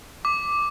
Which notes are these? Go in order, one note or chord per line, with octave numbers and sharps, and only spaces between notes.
D6